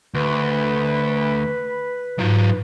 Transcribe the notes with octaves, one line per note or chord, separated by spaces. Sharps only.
D2 B4
G#2 F#3 F4